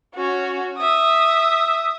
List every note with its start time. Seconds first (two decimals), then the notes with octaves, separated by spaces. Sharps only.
0.14 C#4 F#4
0.78 E5 D#6